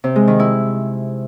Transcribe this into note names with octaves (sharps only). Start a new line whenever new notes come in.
C3
G#3
D#3
E4